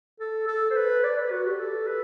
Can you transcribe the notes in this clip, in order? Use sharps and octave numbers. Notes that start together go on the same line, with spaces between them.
A4
A4
C5
B4
D5
B4
F#4
G4
A4
B4